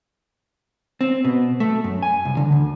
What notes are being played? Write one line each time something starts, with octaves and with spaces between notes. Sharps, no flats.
C4
B2
A3
F#2
G#5
C2
D3
D2